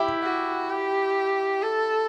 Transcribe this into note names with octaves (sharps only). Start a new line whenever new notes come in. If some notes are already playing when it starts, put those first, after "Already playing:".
Already playing: E4 G4
F#4
G4
A4